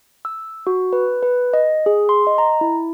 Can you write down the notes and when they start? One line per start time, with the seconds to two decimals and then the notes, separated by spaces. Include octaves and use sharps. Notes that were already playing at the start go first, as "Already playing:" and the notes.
0.25 E6
0.67 F#4
0.93 B4
1.23 B4
1.53 D#5
1.86 G#4
2.09 C6
2.27 D#5
2.38 A#5
2.61 E4